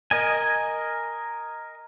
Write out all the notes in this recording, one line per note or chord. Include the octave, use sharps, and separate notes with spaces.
A#4 D#5 G#5